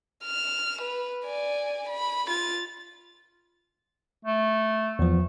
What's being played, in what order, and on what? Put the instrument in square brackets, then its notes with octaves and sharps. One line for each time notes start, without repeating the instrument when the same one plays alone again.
[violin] F6 E7
B4
D5 G#5
B5
F4 A6
[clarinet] A3
[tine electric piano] E2 F3